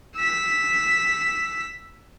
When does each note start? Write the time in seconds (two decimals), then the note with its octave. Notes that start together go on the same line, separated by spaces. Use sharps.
0.16 E6 B6